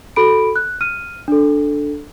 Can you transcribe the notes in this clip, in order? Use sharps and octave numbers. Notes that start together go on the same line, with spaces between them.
F#4 A4 B5 D7
F#6
F6 D#7
D4 A4